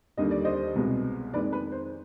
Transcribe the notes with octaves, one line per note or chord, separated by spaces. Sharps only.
D#2 D3 G3 D#5
D5
C5 D#5
C2 B2 G#3 B3
F2 D#3 G#3 B4 D5
B4
C5